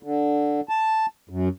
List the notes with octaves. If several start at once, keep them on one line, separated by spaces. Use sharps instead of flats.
D3
A5
F#2